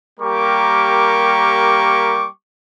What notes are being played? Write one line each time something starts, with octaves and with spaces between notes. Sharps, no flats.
G3 A#3 G4 A#4 C#6 D6